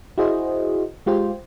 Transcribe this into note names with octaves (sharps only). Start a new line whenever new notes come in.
E4 F#4 G#4 C5 D#5
G#3 F4 G4 C5